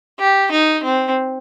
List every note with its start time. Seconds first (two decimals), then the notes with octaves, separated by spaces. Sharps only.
0.19 G4
0.51 D#4
0.83 C4